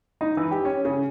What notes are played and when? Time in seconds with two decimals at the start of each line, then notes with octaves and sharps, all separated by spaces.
0.21 D#4
0.37 E3
0.51 G4
0.65 C#4
0.85 C#3